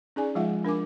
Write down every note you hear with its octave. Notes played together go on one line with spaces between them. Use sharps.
C#4 D#4 G#4 D5 G#5
F3 G#3 F4 E5 F#5
D4 A#4 G#5 D6